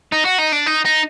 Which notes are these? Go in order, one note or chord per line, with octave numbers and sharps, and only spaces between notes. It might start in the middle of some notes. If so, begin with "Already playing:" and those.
D#4
F#4
D#4
D4
D#4
D#4